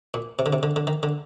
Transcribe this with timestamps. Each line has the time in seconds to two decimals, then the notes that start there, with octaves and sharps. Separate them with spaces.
0.14 A#2
0.39 C3
0.46 D3
0.53 C3
0.63 D3
0.76 D3
0.87 D#3
1.03 D3